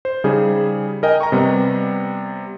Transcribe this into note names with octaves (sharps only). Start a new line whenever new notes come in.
C5
C#3 G3 D#4 G#4
A#4 D#5 G5 G#5
A#5 C#6
C3 G3 B3